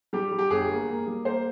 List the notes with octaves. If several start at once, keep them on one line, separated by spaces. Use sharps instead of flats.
G3 G4
G3
G4
G1 G#4
A#3
A#3
G3
A#3 C5